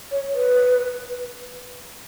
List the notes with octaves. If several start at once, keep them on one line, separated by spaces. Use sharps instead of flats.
C#5
B4